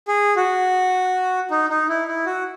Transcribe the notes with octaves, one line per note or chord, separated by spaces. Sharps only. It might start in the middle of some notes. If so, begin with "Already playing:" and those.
G#4
F#4
D#4
D#4
E4
E4
F#4